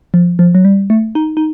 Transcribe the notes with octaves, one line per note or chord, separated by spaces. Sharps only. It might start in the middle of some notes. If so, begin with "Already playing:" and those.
F3
F3
F#3
G3
A3
D#4
D#4